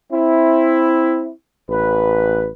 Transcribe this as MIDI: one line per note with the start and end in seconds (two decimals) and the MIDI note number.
0.10 1.30 60
0.10 1.30 64
1.69 2.49 33
1.69 2.49 71